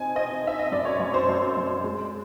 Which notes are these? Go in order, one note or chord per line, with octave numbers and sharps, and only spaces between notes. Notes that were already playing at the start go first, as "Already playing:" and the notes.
Already playing: C4 D#4 G#5
C4 D#5
C4 E5
D#5
F#2 D5
C#5
F#2 C#5
C5
F#2
F#2
G#3